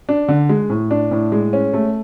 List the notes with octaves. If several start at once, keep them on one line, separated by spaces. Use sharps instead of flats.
D4
D3
G#3
A2
D4
A2
G#3
C#4
A3